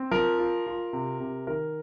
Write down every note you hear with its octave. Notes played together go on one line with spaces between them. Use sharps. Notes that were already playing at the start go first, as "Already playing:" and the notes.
Already playing: C4
F3 A#4
F4
F4
C3
C3
D#3 A#4